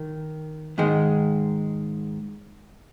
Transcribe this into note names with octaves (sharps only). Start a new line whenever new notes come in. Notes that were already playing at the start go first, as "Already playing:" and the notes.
Already playing: D#3
G#2 D#3 G#3